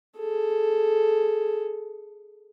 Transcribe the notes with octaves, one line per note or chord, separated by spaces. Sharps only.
G#4 A4